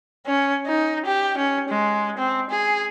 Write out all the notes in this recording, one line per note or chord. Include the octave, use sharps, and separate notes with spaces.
C#4
D#4
G4
C#4
G#3
C4
G#4